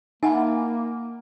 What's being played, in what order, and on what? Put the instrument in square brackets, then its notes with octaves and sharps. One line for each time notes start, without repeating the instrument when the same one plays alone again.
[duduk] A#3 [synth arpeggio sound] D#4 [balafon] E5 F#5 B5 [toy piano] G#5 A5